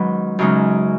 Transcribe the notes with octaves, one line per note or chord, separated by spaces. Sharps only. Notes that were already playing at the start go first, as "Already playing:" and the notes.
Already playing: G#2 D#3 F#3 C#4 B4
F#2 C#3 G#3 D#4